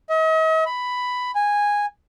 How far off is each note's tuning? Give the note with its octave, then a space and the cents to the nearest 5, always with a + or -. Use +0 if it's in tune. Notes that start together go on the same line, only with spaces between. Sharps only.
D#5 +45
B5 +10
G#5 -10